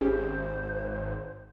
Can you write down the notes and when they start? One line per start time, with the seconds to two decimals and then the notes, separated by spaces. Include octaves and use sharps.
0.01 G#1 C#4 G4 G#4 C5